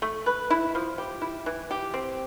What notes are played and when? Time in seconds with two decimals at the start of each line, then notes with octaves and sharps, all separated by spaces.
0.02 A3
0.26 B4
0.50 E4
0.75 F3
0.98 G4
1.22 E4
1.46 E3
1.71 G4
1.94 C4